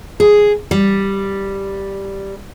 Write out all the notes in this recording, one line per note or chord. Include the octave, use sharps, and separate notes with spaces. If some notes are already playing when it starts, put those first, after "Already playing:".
G#4
G3